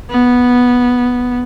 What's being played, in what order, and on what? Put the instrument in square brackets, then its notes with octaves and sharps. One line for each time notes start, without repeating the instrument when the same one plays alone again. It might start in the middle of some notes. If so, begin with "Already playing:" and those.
[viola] B3